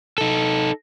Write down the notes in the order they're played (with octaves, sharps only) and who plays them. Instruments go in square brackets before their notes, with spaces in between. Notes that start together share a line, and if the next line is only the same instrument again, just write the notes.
[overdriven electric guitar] D#4 A4